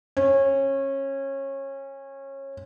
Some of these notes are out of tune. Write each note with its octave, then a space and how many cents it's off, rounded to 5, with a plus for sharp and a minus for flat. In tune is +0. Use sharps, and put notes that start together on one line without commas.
C#4 -25